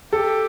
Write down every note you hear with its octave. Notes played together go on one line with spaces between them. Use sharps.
G4 A4